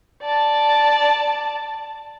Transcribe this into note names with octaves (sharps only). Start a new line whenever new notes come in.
D5 A5